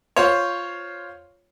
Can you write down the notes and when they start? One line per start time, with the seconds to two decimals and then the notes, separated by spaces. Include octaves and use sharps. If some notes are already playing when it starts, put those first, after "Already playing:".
0.16 F4 C5 C#5